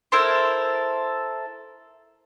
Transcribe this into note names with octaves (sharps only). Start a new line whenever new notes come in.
E4 A4 A#4 C5